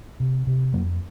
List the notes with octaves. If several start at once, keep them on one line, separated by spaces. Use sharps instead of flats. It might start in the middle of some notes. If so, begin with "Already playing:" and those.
C3
C3
F2 F#3 A#3